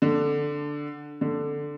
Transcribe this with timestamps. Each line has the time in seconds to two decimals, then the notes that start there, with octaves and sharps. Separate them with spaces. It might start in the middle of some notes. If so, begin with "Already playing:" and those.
0.02 D3
1.21 D3